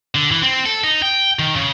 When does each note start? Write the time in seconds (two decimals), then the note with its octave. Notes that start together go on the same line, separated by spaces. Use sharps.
0.15 D3
0.31 E3
0.43 C4
0.66 A4
0.84 D#4
1.02 G5
1.39 D#3
1.56 C#3